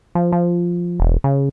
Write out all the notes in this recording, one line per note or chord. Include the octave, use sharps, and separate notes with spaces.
F3
F3
E1
C#3